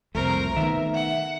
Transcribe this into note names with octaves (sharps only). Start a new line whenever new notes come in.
C2 F2 A3 A#4 C5
D#3 A3 B3 E5
F#5